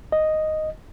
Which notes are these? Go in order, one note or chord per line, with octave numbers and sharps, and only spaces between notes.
D#5